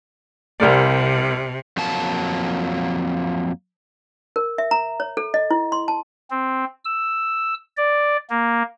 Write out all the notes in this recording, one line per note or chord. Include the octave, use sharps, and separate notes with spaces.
C2 C3 A#4 D5
F2 F#3 A#3 A5
A#4
E5
A#5
C#5
A4
D#5
E4
C6
A5
C4
E6
D5
A#3